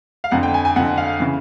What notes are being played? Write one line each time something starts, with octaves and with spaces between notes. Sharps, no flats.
F5
F2 D3 F#5
G5
G#5
G#5
F2 D3 F#5
F5
C#3 E3